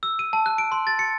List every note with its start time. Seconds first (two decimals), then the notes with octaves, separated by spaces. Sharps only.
0.03 E6
0.19 D#7
0.33 A5
0.46 F#6
0.58 D7
0.72 C6
0.87 A6
0.99 C#7